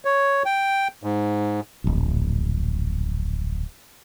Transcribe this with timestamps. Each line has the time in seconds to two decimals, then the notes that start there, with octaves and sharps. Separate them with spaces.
0.05 C#5
0.45 G5
1.03 G#2
1.84 D1 A#1